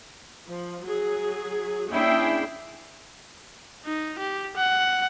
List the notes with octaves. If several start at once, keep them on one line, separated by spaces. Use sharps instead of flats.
F3
F#3 G#4
A#3 C#4 D4 E4 G#4 G5
D#4
G4
F#5